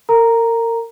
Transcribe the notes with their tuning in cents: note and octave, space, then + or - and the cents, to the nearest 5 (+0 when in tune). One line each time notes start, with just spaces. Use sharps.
A#4 -30 A#5 +0